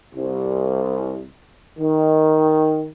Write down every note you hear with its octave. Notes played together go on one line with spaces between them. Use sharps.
C2
D#3